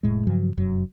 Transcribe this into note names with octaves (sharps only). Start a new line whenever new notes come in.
F1 A2 G#3
G2 C#3 F3 F#3
F1 F#2 F#3